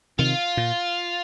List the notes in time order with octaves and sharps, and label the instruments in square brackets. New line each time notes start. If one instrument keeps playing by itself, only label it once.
[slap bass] C3 D#3 [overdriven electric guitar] F4
[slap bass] A#2